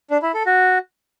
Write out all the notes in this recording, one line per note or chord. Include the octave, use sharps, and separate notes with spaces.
D4
E4
A4
F#4